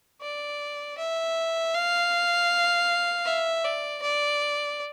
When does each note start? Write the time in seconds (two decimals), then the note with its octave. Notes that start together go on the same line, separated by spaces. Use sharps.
0.21 D5
0.98 E5
1.74 F5
3.25 E5
3.64 D5
4.02 D5